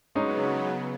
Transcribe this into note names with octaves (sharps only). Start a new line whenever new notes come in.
C#3 F#3 G#3 B3 C#4 D#4